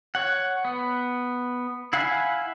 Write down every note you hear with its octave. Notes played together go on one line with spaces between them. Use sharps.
C#5 F#5
B3
E4 F5 F#5 G#5 B5